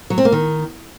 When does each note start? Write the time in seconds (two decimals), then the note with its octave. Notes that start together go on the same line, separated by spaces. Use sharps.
0.10 F#3
0.18 C4
0.25 A#3
0.32 D#3